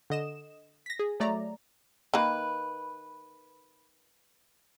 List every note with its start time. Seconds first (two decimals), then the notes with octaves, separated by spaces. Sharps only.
0.10 D3 D#5 E7
0.86 A#6 B6
0.99 G#4
1.20 F#3 A3 D5 A#5
2.14 D#3 A#3 B4